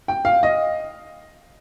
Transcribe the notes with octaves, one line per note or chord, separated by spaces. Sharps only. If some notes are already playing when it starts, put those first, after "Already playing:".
G5
F5
D#5